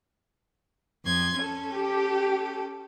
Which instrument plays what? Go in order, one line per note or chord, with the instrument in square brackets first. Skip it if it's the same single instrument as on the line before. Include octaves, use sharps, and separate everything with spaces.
[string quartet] F2 C6 G#6
C#4 A4
[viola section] G4